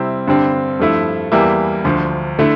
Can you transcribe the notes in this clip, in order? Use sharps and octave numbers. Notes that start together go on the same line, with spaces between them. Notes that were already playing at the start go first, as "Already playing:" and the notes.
Already playing: C3 G3 C4 E4
G2 D3 G3 C4
G2 F3 A3 E4
E2 E3 G3 A#3 E4
D2 D3 F3
D3 A3 E4